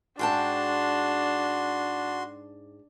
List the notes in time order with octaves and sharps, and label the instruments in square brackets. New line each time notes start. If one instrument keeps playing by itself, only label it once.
[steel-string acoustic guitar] G#2 G5 A5 [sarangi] D4 [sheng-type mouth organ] F#4 C6